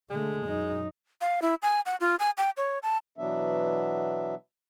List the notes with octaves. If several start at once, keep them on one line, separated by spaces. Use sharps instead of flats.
D3 G#3 A3
F#2 D#4
F5
E4
G#5
F#5
F4
G#5
G5
C#5
A5
B2 E3 F#3 B3 D4 E5